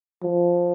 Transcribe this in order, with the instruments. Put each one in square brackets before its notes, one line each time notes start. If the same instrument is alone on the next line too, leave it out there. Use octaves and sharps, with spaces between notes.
[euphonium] F3